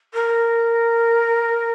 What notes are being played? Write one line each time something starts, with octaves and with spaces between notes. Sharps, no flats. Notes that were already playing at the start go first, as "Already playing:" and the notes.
A#4